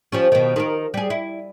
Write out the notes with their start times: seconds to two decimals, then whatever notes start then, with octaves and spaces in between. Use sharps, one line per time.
0.12 F3 G3 C#4
0.32 B2 D#3
0.56 D#3 A4 A#4
0.94 G3 G#4
1.10 E4